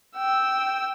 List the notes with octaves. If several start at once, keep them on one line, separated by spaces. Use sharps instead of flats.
G5 E6